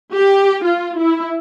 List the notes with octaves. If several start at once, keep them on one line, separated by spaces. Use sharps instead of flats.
G4
F4
E4